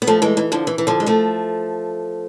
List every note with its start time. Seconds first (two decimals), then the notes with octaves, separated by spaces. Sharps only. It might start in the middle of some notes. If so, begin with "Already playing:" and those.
0.02 B3
0.07 F3 A3
0.22 E3 G#3
0.37 E3
0.52 D3 F3
0.67 E3
0.78 E3
0.87 D3 F3
1.00 G#3
1.06 F3 A3